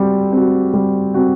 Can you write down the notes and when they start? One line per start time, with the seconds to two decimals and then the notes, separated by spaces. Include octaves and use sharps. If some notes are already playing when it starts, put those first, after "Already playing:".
Already playing: G3 C4 F#4
0.32 C4 F#4
0.73 G3
1.14 C4 F#4